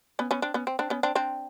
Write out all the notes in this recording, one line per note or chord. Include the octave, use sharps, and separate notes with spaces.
B3 C#4
B3 C#4
C4 D4
B3 C#4
C4
C4 D4
B3 C#4
C4 D4
C4 D4